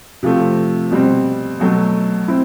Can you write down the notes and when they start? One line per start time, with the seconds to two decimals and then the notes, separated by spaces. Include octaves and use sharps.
0.23 C3 F3 A3 C4
0.91 B2 G3 C4
1.60 B2 F#3 A3
2.28 C4 E4